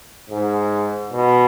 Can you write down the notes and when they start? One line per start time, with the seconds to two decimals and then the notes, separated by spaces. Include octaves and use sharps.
0.30 G#2
1.13 B2